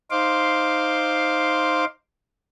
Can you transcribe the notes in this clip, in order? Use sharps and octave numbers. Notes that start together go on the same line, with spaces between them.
D#4 C5 F5 C6 D6